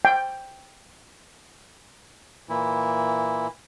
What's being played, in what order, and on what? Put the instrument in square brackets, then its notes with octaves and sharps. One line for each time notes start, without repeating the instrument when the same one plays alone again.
[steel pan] G5
[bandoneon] A#2 E3 E4